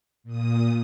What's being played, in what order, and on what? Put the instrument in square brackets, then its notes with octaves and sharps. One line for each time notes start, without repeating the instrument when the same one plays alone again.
[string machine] A#2 D#6